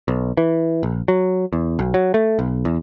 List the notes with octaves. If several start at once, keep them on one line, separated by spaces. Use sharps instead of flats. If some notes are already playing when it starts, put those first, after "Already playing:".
B1
E3
A#1
F#3
E2
B1
F#3
A3
B1
E2